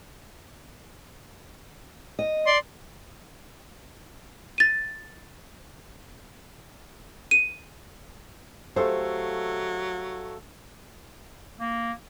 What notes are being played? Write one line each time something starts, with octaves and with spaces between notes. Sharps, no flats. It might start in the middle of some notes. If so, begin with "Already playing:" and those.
D#5
D5 C6
A6 D#7
D#7
F#3 A3 G4 A4 C5 F5
A#3